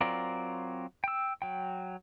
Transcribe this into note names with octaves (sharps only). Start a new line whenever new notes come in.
F#3 C4 F4 A#4 D5
G5 E6
F#3 G5